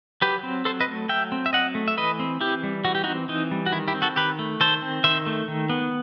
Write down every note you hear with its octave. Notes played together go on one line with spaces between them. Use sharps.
F#3 G4 B4
C4
F#3 A4 C5
B4 D#5
A3
F#3 E5 G5
C4
E5
F#3 D#5 F#5
A3
E5
E3 B4 D#5
C4
E3 E4 G4
G3
E3 F#4
G4
C4 D#4 F#4
E3 D#4
G3
F#4
D#3 E4
E4 G4
C4
F#4 A4
D#3 G4 B4
A3
D#3 A4 C5
C4
D#3 C5 E5
A3
D#3
B3